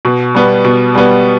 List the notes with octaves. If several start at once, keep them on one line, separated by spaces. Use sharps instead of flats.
B2
G3 B3
B2
G3 B3